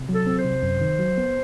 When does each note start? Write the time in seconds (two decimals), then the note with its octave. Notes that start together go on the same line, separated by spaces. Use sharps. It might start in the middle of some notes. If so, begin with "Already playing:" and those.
Already playing: C3
0.09 F#3
0.15 A4
0.27 C4
0.39 C5
0.45 C3
0.63 F#2
0.81 D#3
0.99 F#3
1.18 B3